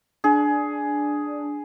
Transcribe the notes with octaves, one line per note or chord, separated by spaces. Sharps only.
D4 G#4